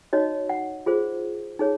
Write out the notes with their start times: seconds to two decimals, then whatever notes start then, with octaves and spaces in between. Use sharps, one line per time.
0.13 D#4 F#4 C#5 D#5
0.49 F#5
0.86 F4 G#4 C5
1.59 D#4 G#4 C#5